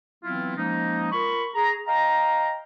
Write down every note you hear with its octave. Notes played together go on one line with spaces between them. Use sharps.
E3 F#3 B3 C4 E4 F4
F3 G#3 A#3 C#4 D#4
F4 A#4 B5 C#6
G#4 A#5
D#5 F5 G5 A#5